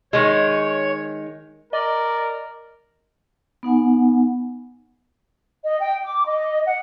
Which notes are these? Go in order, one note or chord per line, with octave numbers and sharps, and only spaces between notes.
D#3 G#3 C#5
A#4 D5 D#5
B3 D#4 F#5 G#5
D#5
G5
D6
D#5
F#5